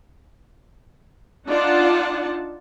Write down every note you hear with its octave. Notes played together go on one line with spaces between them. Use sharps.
D4 D#4 F4 D5 F#5 A5